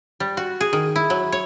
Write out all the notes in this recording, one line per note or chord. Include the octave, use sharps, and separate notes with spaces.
G3
F#4
G#4
D#3
E4
F#3
C#5